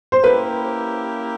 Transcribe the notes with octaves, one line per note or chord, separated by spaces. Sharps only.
C5
A#3 C#4 E4 G4 B4